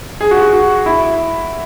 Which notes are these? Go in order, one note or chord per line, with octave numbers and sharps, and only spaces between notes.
G#4
F#4
F#4
F#4
E4